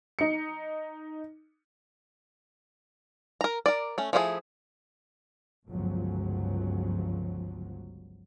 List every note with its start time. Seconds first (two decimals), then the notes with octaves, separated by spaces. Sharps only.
0.19 D#4 C#7
3.41 A#4 A#5
3.66 A#4 D5
3.98 A3 C#4
4.13 F3 A3 E4 F#4 G#4
5.69 G1 C#2 G2 F3 F#3